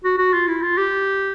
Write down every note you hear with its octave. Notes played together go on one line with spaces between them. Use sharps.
F#4
F#4
F4
E4
F4
G4